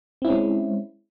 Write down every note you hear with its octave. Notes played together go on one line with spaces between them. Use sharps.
G#3 C4 C#4 E4